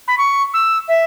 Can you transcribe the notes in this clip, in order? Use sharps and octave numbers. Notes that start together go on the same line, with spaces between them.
B5
C#6
E6
E5